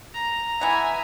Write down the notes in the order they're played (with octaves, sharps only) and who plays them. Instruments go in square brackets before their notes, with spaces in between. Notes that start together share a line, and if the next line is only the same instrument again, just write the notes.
[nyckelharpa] A#5
[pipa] E3 B3 [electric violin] E5 G#5